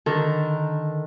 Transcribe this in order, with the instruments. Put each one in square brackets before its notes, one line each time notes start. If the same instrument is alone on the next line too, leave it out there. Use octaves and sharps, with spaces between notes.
[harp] D3 D#3 D4 A4 A#4